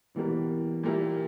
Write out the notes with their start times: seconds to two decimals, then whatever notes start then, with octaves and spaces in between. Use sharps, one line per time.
0.16 B2 E3 G3 A#3
0.83 A#2 G3 A#3 E4